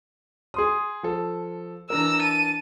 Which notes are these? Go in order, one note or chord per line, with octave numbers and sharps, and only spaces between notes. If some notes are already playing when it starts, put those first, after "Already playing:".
G#4 C6 D#6
F3 A4
E3 D4 A#4 A#5 E6
A5 D#7